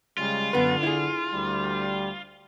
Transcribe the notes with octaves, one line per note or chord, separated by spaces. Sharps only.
C#3 G3 G#3 F4
F#2 D3 B3 B4
E4 G#4
D2 G3